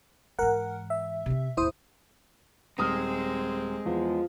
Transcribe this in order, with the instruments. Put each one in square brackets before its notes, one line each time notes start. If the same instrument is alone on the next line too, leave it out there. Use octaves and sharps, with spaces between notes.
[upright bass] G#2 E3 [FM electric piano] A#4 F#5
[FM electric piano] E5
[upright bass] C3 C4
[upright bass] D#2 G#2 [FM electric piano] E4 C5 D#6
[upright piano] D#1 D#6 F6 [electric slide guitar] G#3 [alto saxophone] C4
[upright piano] E2 [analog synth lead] F3